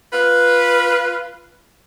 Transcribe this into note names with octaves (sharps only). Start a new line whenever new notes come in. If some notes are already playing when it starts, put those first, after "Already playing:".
F4 B4